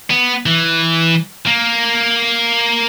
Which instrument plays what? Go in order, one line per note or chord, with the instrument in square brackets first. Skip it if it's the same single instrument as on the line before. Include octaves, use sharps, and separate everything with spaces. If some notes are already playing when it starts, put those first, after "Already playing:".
[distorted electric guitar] B3
E3
A#3